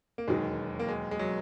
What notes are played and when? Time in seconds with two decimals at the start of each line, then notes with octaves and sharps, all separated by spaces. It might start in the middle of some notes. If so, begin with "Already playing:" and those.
0.18 A#3
0.28 E1 D#2 D#3 F#3 G#3
0.79 A#3
0.89 G#3
1.11 G#3
1.19 F#3